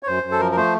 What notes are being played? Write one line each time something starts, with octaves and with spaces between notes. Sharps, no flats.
C#5
F#2 C5
F#2
A4
F3 A#4
A#4
A3 C5